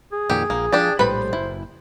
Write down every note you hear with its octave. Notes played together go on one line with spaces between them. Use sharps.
G#4
F2 A#2 D#3 G4
A#1 A#3
F3 D4 G4 D5
A#1 A2 G3 B4 C5 B5
F#1 E4